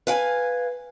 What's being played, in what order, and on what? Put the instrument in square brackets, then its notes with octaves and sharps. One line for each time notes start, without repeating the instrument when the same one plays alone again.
[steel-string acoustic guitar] B4 F5 G#5